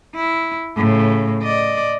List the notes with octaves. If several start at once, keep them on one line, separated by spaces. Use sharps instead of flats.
E4
A2 C#3
D5 D#5